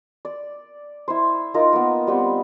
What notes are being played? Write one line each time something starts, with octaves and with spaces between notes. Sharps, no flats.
D5
E4 C5
D#4 F4 A#4
A#3 B3
G3 B3 C4